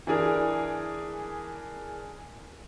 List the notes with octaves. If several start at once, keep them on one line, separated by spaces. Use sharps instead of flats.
E3 D4 G#4 A#4